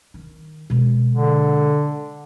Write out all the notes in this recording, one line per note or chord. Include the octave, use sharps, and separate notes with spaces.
D#3
B2 G#3
D3